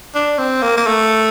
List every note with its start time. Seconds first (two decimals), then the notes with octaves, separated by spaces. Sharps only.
0.15 D4
0.38 C4
0.62 A#3
0.77 A#3
0.87 A3